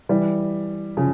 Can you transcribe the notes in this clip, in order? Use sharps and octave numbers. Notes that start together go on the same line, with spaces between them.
E3 G3
C#3 F3